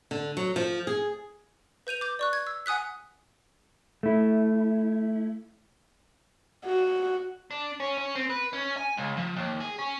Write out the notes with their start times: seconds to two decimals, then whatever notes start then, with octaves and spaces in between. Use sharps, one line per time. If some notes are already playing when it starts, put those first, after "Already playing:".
0.11 D3
0.37 F#3
0.56 F3
0.87 G#4
1.87 B4 G6 D#7 F7
2.01 D6 G6
2.19 D5 C#6 F#6
2.33 G#6
2.47 E6
2.66 F#5 G#5 D#6 F#6 B6
4.03 A3 E4
6.65 F#4
7.51 D4
7.80 C#4
7.98 C#4
8.15 C4
8.30 B4
8.53 C#4
8.77 G#5
8.97 C#2
9.17 F3
9.36 D#2
9.60 G#4
9.79 C#4